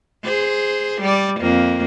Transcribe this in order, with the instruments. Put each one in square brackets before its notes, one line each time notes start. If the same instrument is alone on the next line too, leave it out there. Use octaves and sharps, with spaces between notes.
[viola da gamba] G#4 C5
G3 D5
F2 A#3